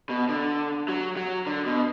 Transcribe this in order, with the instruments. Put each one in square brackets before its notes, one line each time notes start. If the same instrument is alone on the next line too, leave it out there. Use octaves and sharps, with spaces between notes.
[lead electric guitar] B2
D3
F#3
F#3
D3
B2